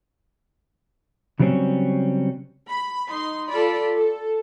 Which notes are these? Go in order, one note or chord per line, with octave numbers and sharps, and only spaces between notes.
C#3 F#3 G3 C4 C#4
B5
D#4 C6
F4 A4 D5 B5
A4